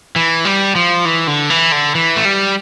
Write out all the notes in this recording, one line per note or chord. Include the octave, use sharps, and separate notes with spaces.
E3
G3
F3
E3
D3
E3
D3
E3
A3
G3